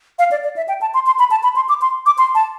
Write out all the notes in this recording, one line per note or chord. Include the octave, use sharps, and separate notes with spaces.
F5
D5
D5
E5
G5
A5
C6
C6
B5
A5
B5
C6
D6
C6
D6
C6
A5